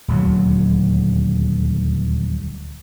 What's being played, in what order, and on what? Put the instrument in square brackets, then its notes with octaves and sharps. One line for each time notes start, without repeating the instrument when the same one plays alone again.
[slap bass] D#1 D2 F#3